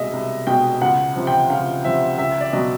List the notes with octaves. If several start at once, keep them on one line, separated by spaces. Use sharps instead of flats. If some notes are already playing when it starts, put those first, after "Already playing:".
Already playing: C2 B2 G#3 D#5 E5
C2
B2 G#3 G5
C#2 F#5
C3 F3
G5
C#2 F5
C3 F3 E5
C#2 E5
D5
B2 F#3 D#5